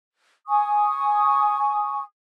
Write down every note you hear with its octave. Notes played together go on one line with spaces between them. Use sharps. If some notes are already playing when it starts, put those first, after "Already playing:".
G#5 C#6 D#6